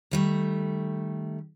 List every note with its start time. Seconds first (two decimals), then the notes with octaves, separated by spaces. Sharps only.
0.11 D#3 G3 A3